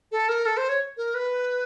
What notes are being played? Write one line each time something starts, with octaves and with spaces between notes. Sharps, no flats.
A4
A#4
A4
C5
C#5
A#4
B4